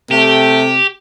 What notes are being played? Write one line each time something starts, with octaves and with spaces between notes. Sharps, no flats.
C3 A3 G4